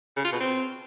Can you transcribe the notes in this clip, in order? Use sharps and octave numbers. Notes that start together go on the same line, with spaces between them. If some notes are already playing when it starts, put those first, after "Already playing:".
C#3
F4
B2
C4